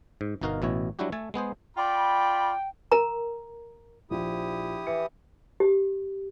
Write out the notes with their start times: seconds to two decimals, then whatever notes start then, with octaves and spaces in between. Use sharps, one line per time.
0.21 G#2
0.41 G1 B2 D#4 F#4 A#4 F5
0.62 A1 B2 E4 C#5
0.99 F#3 G3 D4 E4 F#4 G4
1.12 A3 A4 G#5 A5
1.34 G#3 B3 G#4 C5
1.77 F4 D5 G5 B5
2.92 A#4 A#5
4.11 A#1 F3 E4 G4 D#6
4.87 E3 C#7
5.60 G4